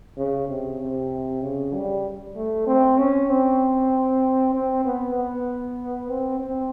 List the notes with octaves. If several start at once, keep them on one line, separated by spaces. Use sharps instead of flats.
C#3
C3
C3
C#3
G3
A3
C4
C#4
C4
C4
B3
B3
C4
C4